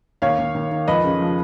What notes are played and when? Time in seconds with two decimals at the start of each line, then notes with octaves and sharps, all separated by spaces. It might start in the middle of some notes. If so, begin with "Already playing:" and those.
0.22 D#2 C#5 F5
0.38 D#2
0.54 D#2
0.72 D#3
0.88 F2 B4 D#5
1.04 C#3
1.21 F3